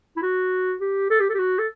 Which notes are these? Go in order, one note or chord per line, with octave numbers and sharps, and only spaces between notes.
E4
F#4
G4
A4
G4
A4
G4
F#4
A4